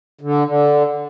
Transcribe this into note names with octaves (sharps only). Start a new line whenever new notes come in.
D3
D3